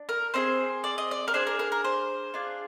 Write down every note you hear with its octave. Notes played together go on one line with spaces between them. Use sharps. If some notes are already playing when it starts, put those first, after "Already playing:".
Already playing: D4
A#4
C4 D#4 G#4 C5
D5
D#5
D5
A#4
D4 G#4 C5
A#4
A#4
A#4
C5
D4 F4 G#4